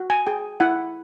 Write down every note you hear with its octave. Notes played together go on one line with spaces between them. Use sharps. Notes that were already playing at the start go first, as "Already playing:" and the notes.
Already playing: F#4
G#5
G#4 G5
E4 F#5